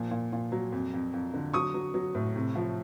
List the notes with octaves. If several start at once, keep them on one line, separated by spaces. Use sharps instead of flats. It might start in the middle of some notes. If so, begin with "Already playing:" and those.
Already playing: A#2 F3
A#2
A#2
F#3
F2
F2
F2
D3
F#3 C#6 D#6
F#3
F#3
A2
C3
F3